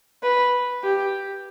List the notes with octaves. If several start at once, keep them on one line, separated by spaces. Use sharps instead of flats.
B4
G4